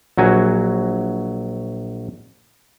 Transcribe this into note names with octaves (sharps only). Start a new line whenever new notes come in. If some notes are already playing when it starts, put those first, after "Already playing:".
A#1 F#3 F#4 G#5